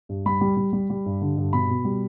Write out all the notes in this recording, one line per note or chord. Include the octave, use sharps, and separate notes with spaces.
G2
G3 B5
G3
G3
G3
G3
G2
D3
G2
B2 B5
B2
G3